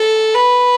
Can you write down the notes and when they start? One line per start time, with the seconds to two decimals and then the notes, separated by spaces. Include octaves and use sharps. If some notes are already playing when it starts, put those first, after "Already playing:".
Already playing: A4
0.35 B4